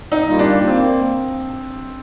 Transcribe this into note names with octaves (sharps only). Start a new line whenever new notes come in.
D#4
G3 A#3 F4
D4
A#3 C4